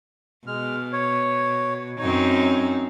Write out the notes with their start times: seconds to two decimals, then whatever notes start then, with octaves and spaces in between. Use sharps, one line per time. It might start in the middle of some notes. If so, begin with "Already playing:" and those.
0.47 B2 G#3 F6
0.92 C#5
1.99 F#2 C4 D#4 C#5